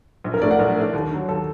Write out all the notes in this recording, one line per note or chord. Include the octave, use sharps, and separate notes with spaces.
A#1
A#4
A2 A3 D4 D5
F#5
A#1 A#4
A2 A3 D4
D#2
D3 F#3
D#2 A4